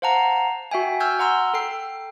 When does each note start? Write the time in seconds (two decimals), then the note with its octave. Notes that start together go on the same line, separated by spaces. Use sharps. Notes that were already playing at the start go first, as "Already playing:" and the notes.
0.02 C5 F5 F#5 A5 A#5
0.71 F#4 E5 G5 G#5
1.00 G#5 E6 F6 G6 G#6
1.19 F#5 A#5 C6 E6 F6
1.54 A4 G5 C7